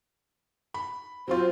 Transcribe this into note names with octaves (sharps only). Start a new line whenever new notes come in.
B5
F#3 C4 F4 C5